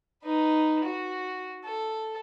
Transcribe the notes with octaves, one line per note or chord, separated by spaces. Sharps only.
D#4 B4
F#4
A4